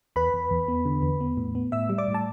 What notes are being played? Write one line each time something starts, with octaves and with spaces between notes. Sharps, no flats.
E2 B4 B5
E2
E2
B3
D3
E2
B3
A2
B3
A2 E5 E6
G3
D5 D6
A2
A5